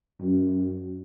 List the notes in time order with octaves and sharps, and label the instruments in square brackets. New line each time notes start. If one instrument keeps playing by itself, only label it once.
[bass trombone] F#2